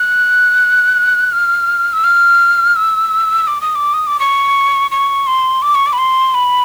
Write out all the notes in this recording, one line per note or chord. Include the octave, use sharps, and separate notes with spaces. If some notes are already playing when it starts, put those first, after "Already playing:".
Already playing: F#6
F6
E6
F6
E6
D6
D#6
D6
D#6
D6
C#6
C#6
C6
D6
C#6
D6
B5
C6
B5